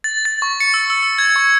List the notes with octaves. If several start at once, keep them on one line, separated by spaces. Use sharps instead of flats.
A6
A6
C#6
C#7
E6
E6
E6
G#6
C#6